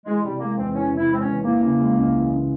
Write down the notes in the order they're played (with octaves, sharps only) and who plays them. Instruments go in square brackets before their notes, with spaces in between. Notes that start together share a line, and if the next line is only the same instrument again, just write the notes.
[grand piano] E3 [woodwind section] G#3
[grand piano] C3 [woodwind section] G3
[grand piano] G#3 [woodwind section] A#3
[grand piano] E2 [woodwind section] C4
[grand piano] E3 [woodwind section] C#4
[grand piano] C3 [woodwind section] E4
[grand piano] G#3 [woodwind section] C4
[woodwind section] C#4
[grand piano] E2
[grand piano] E3 [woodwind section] A#3
[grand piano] C#3
G#3
C#2
E3
C#3